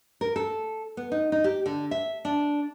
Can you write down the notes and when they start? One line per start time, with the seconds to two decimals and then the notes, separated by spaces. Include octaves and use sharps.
0.21 A#4
0.36 A4
0.97 B3
1.12 D#4
1.32 D#4
1.44 G4
1.66 D3
1.91 E5
2.25 D4